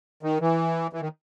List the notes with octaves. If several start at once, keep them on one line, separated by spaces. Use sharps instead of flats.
D#3
E3
E3
D#3